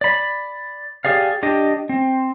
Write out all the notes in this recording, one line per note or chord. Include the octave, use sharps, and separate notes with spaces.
D5 B5
G4 G#4 D5 F5
D4 G4 D#5
C4